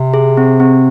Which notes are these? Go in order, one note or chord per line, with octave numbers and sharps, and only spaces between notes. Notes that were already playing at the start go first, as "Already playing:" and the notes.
Already playing: C3
G#4
C4
C4